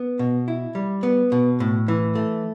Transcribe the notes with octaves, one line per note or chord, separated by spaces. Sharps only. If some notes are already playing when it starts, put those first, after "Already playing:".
Already playing: B3
B2
E4
G3
B3
B2
A2
E3
A3